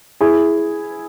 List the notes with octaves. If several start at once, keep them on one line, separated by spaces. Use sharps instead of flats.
E4 G#4